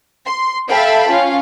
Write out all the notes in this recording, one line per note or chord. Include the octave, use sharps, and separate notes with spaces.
C6
A4 E5 F5 G5 A5 B5
C#4 F4 F5